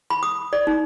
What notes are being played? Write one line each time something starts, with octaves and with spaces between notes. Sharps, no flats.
B5
D#6
D5
D#4